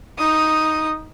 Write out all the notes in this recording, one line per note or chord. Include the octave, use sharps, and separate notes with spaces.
D#4 D#6